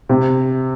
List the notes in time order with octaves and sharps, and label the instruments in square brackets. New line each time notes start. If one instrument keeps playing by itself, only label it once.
[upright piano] C3